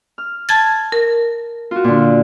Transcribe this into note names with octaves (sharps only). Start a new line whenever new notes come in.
F6
A5 G#6 A6
A#4
F4 F#4
A#2 D3